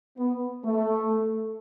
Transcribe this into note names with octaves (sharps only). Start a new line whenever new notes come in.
B3
A3